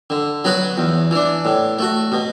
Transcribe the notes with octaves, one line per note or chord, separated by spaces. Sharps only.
D3
F#3 B3 F#4 B4
E2
E3 D4
A2
A3 F#4
B2